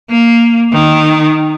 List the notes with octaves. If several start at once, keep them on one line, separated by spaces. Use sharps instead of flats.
A#3
D#3